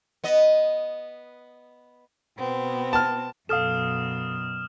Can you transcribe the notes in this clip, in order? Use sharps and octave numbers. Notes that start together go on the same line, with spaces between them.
B3 D#5
B2 B3 C4
A5 F6
F#2 B2 A4 F5 D#6 F6 E7